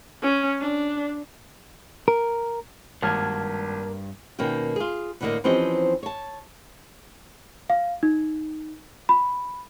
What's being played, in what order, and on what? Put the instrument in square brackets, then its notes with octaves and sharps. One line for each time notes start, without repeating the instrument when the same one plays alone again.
[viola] C#4
D4
[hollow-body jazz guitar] A#4
[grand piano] G#1 [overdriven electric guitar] G2 [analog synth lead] A#3 [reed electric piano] A5 F6 G#6
[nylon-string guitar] B2 D#3 A#3 C#4 G5
F4 G#4
E2 A2 D3 F#3 A#3 D#5
E3 F3 C4 C#4 G4 D#5
C#5 A5
[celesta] F5
D#4
B5